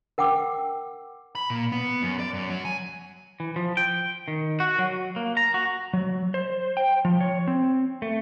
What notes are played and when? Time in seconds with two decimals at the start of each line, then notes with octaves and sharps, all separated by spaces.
0.18 A#4 F#5 G5 D6 E6
1.35 B5
1.50 A#2
1.72 B3
2.02 F#2
2.20 D5
2.34 F#2
2.50 F#3
2.65 G#5
3.40 E3
3.56 F3
3.77 G5
4.28 D#3
4.60 F#4
4.79 F#3
5.16 A#3
5.37 A#5
5.54 F#4
5.93 F#3
6.34 C5
6.77 G5
7.05 F3
7.21 C#5
7.48 C4
8.02 A3